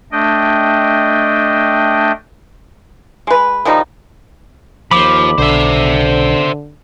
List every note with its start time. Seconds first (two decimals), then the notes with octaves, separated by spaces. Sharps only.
0.12 A3 D4 D#5 G5
3.27 G#3 B4
3.65 D#3 F3 G3 D#4
4.91 D#2 F3 B5 D6
5.38 B1 D3 C5 E5